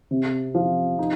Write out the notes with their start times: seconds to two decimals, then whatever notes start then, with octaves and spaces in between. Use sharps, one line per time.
0.11 C3
0.55 F3
0.99 D#4